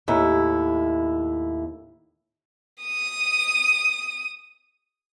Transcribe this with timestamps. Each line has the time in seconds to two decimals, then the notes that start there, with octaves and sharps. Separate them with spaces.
0.08 D#2 A2 E4
2.83 D#6 D#7